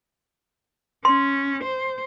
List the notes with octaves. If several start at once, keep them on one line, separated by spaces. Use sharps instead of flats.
C#4 C6
C5